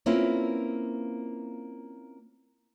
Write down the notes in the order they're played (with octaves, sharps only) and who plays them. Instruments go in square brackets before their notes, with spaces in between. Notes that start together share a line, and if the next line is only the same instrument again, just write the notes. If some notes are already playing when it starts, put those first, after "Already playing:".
[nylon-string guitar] A#3 C4 C#4 E4 F4 B4